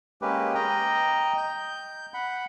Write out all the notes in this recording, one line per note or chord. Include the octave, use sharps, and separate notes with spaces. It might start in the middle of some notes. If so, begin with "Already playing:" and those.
G#3 A#3 C#4 G4 B4
D#5 G5 A#5
G6
F#5 B5